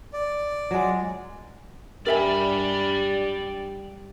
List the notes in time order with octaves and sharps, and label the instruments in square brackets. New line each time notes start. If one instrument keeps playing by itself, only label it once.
[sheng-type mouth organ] D5
[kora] F#3 G#3
[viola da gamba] G2 D4 [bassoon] G4 [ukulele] A#4 E5 G#5 [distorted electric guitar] D5 B5